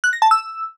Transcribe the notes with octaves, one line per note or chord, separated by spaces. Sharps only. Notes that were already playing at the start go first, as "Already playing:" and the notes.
F#6
A#6
A5
E6